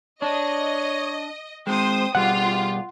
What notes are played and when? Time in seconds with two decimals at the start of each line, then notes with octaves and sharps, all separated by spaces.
0.22 D4 C#5 D#5
1.67 G#3 C4 C5 G5 D#6
2.15 B2 G3 F4 G4 G#4 F#5